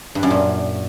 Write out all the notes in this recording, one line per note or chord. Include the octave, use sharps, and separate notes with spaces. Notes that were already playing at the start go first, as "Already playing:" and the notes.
G2
F#2
A#2